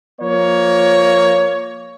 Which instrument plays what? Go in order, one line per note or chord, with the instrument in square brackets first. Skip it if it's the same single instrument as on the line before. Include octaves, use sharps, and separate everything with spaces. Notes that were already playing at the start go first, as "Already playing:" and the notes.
[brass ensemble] F3 A#3 C#5